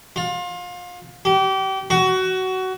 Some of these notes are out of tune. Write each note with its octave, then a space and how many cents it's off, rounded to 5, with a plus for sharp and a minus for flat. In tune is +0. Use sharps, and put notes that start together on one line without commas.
F4 +30
G4 -30
F#4 +20